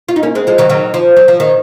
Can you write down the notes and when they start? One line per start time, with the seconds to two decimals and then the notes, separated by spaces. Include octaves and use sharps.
0.09 F4
0.16 D#4
0.23 A#3 C#4
0.35 G#3 C4
0.47 F3 G#3
0.58 D#3 F#3
0.69 D#3 F#3
0.94 F3
1.17 F#3
1.28 F3
1.40 D#3